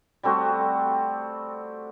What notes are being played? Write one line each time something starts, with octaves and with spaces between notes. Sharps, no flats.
G3 A3 C4 F#4